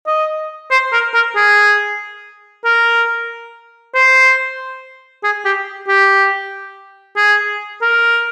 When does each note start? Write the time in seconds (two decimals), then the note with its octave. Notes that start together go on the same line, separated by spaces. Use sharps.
0.07 D#5
0.71 C5
0.93 A#4
1.14 A#4
1.36 G#4
2.65 A#4
3.94 C5
5.23 G#4
5.45 G4
5.88 G4
7.16 G#4
7.81 A#4